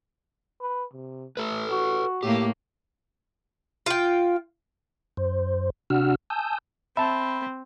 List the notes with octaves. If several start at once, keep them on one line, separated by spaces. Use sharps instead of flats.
B4
C3
A3 A4 B4
F#4
A2 A#3 G4
F4 G5
F#2 C5
C3 D4 F#4 F#5 E6 F6
G#5 A5 D#6 E6 G6
C4 E5 A5 B5